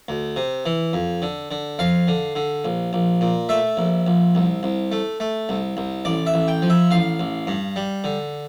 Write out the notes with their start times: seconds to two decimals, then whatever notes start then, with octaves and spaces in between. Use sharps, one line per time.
0.08 D2
0.36 C3
0.66 E3
0.93 F2
1.22 D3
1.51 D3
1.79 F2 F5
2.08 D3
2.35 D3
2.65 A#1
2.93 A#1
3.21 A#2
3.49 A3 E5
3.77 A#1
4.07 A#1
4.35 C2
4.63 C2
4.92 A3
5.20 A3
5.49 C2
5.77 C2
6.05 A1 D5
6.26 E5
6.34 A1
6.48 G5
6.62 F3
6.70 E5
6.91 A1 F5
7.19 A1
7.47 G2
7.76 G3
8.04 D3